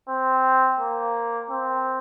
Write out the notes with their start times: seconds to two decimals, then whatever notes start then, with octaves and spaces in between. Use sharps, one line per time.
0.09 C4
0.79 A#3
1.50 C4